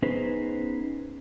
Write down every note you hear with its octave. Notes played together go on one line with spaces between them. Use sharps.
B3 C#4 D#4 G#4 B4 C5